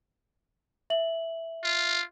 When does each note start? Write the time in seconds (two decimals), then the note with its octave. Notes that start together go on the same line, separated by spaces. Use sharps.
0.90 E5 F#7
1.63 F4